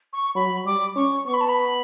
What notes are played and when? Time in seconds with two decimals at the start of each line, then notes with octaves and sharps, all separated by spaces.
0.13 C#6
0.35 F#3 B5
0.66 G3 D6
0.95 C#4 C#6
1.26 B3 C#6
1.34 B5
1.41 A5
1.49 B5